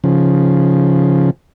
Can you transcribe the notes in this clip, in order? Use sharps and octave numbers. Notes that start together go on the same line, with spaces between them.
C#3 F3